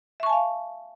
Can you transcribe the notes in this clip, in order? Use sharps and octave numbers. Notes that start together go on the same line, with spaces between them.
E5 F5 G#5 A5 C#6